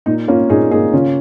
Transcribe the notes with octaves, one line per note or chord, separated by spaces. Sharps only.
A#2 D#4
A#3 C#4 F4
A#2 D#4 G#4
A#3 D#4 G#4
C#3 C#4 F4